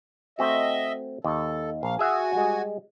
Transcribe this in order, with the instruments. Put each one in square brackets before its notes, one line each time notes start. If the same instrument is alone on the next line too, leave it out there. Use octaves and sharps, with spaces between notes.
[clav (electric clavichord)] A3 C4 F#4 [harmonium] D#5 E5
[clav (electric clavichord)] D#2 [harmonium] A4
[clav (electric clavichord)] A#1 [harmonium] F5
[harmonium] F#4 G#5 [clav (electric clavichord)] G#4 E5 F#5
[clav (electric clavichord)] G3 G#3